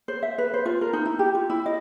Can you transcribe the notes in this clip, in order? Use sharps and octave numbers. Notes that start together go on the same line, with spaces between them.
C5
E5
B4
C5
F4
A#4
D#4
E4
G4
F4
E4
D#5